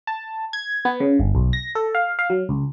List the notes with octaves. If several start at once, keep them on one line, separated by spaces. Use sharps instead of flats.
A5
G#6
B3
C#3
G1
B1
A#6
A4
F5
F5
F#3
C#2